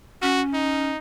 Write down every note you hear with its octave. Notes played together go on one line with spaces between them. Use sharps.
C#4 F#4
D#4